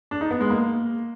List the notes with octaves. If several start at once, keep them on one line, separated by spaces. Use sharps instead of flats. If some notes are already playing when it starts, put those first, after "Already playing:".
D4
D#4
B3
G#3
A#3